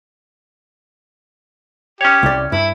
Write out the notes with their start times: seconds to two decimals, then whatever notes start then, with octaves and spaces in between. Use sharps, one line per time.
2.01 C#4 G4 C#5
2.23 C2 D5
2.52 G2 E4